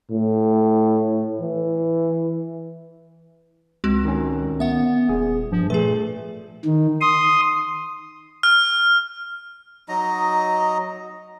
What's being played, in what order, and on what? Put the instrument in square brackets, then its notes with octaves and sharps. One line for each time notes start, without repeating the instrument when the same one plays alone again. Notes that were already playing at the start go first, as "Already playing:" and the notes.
[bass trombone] A2
E3
[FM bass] C#2 [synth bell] G#3 C4 F#4
[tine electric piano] D#3 C#4
[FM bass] B3 [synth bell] E5 F#5
[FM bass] D#1 [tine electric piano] G#4
[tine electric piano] G2 [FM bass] F3
[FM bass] A#2 [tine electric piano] A3 [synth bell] G#4 B4
[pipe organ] D#3
C6 D#6
[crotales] F6
[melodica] F#3 D#4 D#5 A#5